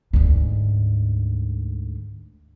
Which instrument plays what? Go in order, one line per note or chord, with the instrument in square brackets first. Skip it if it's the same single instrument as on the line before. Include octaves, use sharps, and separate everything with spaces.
[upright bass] D2 G#2